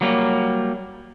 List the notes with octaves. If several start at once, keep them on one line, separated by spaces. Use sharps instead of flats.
F#3 G3 A#3